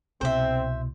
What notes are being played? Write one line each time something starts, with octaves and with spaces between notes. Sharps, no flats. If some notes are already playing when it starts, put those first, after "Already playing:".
C2 B2 C4 C5 E5